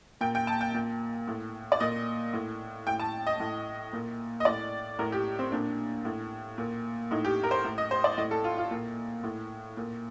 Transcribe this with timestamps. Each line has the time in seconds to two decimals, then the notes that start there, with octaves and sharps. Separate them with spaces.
0.21 A#2 G5
0.35 G5
0.47 A5
0.61 G5
0.74 A#2
1.28 A2
1.72 D5
1.80 A#2 D#5
2.33 A2
2.87 A2 G5
3.00 A5
3.27 D#5
3.40 A2
3.93 A#2
4.40 D#5
4.45 A2 D5
4.99 A2 A#4
5.12 G4
5.39 C4
5.52 A#2 D4
6.05 A2
6.58 A#2
7.11 A2 D#4
7.24 G4
7.43 A#4
7.51 C5
7.64 A2
7.78 D#5
7.91 C5
8.04 D5
8.18 A2 D#5
8.31 A4
8.44 F4
8.58 F4
8.71 A#2
9.23 A2
9.77 A#2